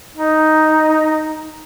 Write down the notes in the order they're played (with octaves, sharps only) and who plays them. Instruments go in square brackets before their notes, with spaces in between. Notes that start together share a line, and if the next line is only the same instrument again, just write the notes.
[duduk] D#4